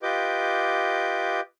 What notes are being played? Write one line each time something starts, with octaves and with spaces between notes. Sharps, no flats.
F4 G4 B4 D#5 D6 G6